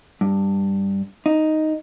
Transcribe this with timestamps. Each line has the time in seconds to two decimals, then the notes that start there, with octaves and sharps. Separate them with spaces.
0.21 G2
1.26 D#4